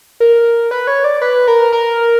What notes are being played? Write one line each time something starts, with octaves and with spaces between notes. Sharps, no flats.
A#4
B4
C#5
D5
B4
A#4
A#4